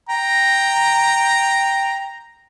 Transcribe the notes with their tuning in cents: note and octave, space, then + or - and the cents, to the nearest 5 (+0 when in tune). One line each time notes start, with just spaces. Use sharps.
G5 +0 A#5 +0